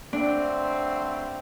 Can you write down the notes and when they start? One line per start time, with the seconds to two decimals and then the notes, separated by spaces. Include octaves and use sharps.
0.13 G2 D3 A3 C4 D4